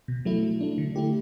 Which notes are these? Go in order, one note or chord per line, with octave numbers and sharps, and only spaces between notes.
B2
F#3 A3 E4
F#3
A3 D4
D3
A3 E4 G4